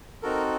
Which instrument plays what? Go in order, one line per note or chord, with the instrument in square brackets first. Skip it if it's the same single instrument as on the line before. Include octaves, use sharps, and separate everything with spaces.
[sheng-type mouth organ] C4 D#4 F#4 A4 A#4